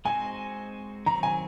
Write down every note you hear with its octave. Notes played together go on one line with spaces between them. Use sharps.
G#3 C4 D#4 F#4 C5 G#5
D#3 F#3 C4 A#5
G#5